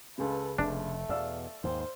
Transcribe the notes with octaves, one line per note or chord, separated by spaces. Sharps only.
C#2 C#3 A4 B4
F1 A3 D4
E2 B2 D5 F5 E6
D#2 G#2 D#3 C5